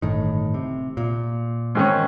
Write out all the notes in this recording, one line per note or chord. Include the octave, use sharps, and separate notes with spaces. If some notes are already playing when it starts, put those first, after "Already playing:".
G1 A2 D#3
C3
A#2
G#2 D#3 C#4